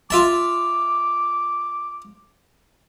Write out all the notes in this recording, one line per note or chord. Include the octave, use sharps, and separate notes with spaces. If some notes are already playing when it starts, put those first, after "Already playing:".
F4 E5 A5 D6